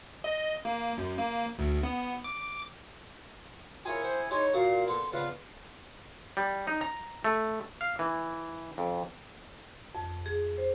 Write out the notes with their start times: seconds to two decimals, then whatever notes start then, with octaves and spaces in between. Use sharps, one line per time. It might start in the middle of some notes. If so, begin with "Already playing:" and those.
0.24 D#5
0.65 A#3
0.98 F#2
1.17 A#3
1.59 D2
1.83 B3
2.24 D6
3.86 E4 F4 G#4 A#4 C#5 G#5
4.02 C5 F#5 G5
4.31 D#4 E4 G#4 C#5 C6 D6
4.54 A#2 F#4 F5 D6
4.88 B3 A4 C6
5.12 C#3 B3 D4 F4 B4
6.37 G3
6.67 D#4
6.81 A#5
7.24 A3
7.81 F5
7.99 E3
8.78 F2
9.95 F2
10.26 G#4
10.58 C5